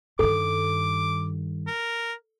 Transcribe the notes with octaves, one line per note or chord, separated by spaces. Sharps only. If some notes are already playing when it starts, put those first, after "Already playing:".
G2 D#3 A4 D6
A#4